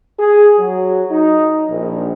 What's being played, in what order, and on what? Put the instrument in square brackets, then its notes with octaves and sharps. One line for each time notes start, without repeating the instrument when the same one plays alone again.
[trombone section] G#4
F#3
D#4
A#1